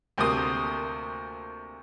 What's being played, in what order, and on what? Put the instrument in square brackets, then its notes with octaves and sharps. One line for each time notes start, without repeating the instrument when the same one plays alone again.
[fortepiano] D2 C3 A#3 C6 D#6